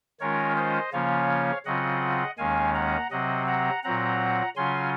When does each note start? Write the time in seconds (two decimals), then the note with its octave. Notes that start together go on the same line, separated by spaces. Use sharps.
0.20 D#3 G#3 C#4 F4 A#4 C#5
0.57 C5 D#5
0.93 C#3 F3 A#3 C#4 F4 C#5 F5
1.65 C#3 F#3 C4 F4 D#5 F#5
2.38 D#2 D#3 G#3 C#4 F5 G#5
2.74 F#5 A#5
3.11 C3 F#3 C4 D#5 F#5
3.47 F#5 A#5
3.84 A#2 F#3 C4 F#5 A#5
4.57 C#3 F#3 C#4 F4 G#5 C6